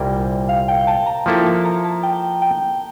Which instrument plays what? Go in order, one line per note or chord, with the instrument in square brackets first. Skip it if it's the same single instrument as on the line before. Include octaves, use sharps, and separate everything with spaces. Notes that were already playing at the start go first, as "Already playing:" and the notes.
Already playing: [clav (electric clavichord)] C2 A#2 G3 A#3 [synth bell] G5
[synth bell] F5
G5
A5
A#5
[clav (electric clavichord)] F3 A#3 E4 A4 [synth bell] A5
[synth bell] A5
A#5
A5
G5
G5